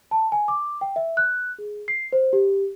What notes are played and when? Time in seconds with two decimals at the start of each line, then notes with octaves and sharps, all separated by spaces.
0.11 A5
0.32 G#5
0.48 D6
0.81 G5
0.96 E5
1.17 F#6
1.58 G#4
1.88 C7
2.13 C5
2.33 G4